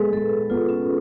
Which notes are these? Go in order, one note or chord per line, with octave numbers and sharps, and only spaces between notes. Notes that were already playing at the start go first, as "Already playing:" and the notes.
Already playing: G#3 B3 G#4 A4 B4
G#3 A4
B3 F4
C#4